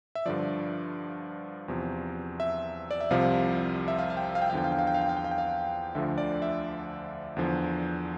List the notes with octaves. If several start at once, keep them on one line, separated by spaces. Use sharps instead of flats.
E5
G2 D3 F3 D5
E2 C3 F3
E5
D5
E5
C2 C3 F3 F5
E5
F5
F5
G5
F5
G5
F5
E2 D3 F3 G5
F5
G5
F5
G5
F5
G5
F5
G5
F5
G5
F5
D2 D3 F3 E5
D5
E5
E2 D3 F3